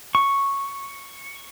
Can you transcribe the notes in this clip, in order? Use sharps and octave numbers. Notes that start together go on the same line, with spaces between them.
C#6